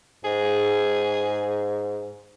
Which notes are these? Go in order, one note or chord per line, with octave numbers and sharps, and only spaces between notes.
G#2 G#4